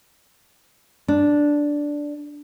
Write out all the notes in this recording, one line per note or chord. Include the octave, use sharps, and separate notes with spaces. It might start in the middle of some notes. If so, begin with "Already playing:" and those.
D4